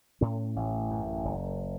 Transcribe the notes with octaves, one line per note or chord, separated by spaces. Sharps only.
A2 C#4
A1
F#2
F#1